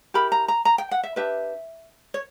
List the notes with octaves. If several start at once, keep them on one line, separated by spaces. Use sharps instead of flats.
E4 G4 A#4 B5
A#5
A#5
A#5
G5
F#5
E5
D4 G4 B4 E5
C#5